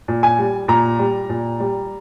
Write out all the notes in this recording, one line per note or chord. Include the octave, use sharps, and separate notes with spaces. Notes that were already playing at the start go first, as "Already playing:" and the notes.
A#2
G#5
G3
A#2 A#5
G3
A#2
G3